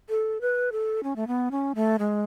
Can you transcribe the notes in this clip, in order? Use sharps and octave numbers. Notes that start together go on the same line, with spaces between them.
A4
B4
A4
C#4
A3
B3
C#4
A3
G#3